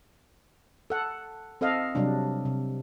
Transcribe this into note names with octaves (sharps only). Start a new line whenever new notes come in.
A4 F#5
C4 A4 D#5 F5
C3 F#3 G3 D4
C3